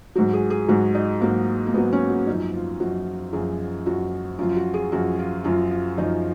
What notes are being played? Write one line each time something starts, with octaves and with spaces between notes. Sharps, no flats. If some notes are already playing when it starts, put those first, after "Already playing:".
G#2 F#3 F#4
G#4
G#4
G#2 F#3 F#4
D#4
G#2 F#3 A#3
A#3
G#2 F#3 B3
C#4
F#4
F#2 F3 D#4
F4
F#2 F3 F#4
F#2 F3 G#4
F#2 F3 F#4
F#2 F3 F4
F4
F#4
G#4
F#2 F3 F#4
F4
F#2 F3 F4
F4
F#2 F3 D#4